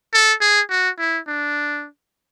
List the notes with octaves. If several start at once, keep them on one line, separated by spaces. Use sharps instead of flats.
A4
G#4
F#4
E4
D4